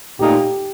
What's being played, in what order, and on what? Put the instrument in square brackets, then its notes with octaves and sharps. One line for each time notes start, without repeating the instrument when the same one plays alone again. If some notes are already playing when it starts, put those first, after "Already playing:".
[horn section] A#2 A3 D#4 [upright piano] G4